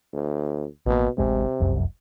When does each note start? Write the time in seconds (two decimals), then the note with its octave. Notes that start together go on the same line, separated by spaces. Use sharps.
0.13 D2
0.86 A1 B2 A#3
1.18 D1 A1 C3 G#3
1.60 F1 C2 F#2